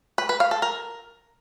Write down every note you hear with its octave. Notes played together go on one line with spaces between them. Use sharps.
B4
B4
F5
A4
A#4